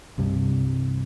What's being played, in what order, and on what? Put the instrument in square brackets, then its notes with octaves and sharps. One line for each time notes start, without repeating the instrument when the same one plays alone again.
[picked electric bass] C2 G2 C3